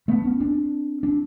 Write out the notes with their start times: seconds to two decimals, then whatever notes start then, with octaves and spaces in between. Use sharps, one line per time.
0.08 A3 B3
0.24 B3 C#4
0.40 C4 D4
1.03 C4 D4